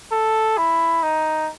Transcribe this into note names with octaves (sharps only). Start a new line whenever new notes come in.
A4
E4
D#4